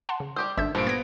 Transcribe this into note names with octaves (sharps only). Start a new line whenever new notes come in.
F#5 A5 C6
C#3
G3 G4 C5 D#6
G#1 D4 A4 E5 G6
G2 A#2 F3 C5 D7
B3 G#6 A#6 D7